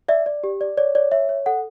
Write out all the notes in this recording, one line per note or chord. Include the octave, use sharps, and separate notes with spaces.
D5 E5
D5
G4
D5
C#5 D5
C#5 D5
C#5 E5
C#5
A4 F#5